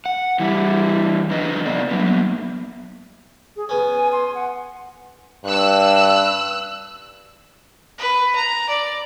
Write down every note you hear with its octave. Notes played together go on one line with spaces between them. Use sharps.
F#5
E3 G3 E4
E2 D3 F3 B4 D#5
C3 B3 D5
F#3 A#3 B3
G#4
B3 C#4 G#5
C6
F#5
G2 E6 F#6
B4
A#5
D5